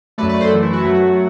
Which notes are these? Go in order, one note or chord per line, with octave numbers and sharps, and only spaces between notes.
F#2 F#3 A3 B4 D5
B4 D5
A4 C5
F#2 E3 A3
E4
F#4
F#2 F#3 A3 F#4